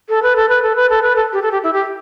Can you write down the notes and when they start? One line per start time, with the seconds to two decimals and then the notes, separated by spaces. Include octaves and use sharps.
0.09 A4
0.23 B4
0.36 A4
0.49 B4
0.63 A4
0.76 B4
0.90 A4
1.03 B4
1.16 A4
1.33 G4
1.42 A4
1.52 G4
1.63 E4
1.73 G4